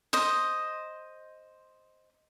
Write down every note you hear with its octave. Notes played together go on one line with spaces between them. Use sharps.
C5 D#5